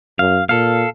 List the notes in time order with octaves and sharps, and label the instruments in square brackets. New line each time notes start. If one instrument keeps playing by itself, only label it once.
[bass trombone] F#2 [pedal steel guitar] F5
[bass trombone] A#2 [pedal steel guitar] A4 F5